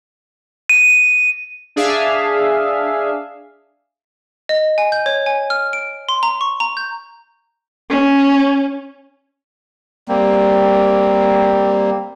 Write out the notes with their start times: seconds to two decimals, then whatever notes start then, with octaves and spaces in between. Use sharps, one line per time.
0.69 D#7
1.76 D4 G#4 E5 F5
4.49 D#5
4.78 G#5
4.92 G6
5.06 C#5
5.26 G#5
5.50 F6
5.73 D7
6.09 C6
6.23 A#5
6.41 C#6
6.60 A#5
6.77 G6
7.90 C#4
10.08 G3 A#3 C4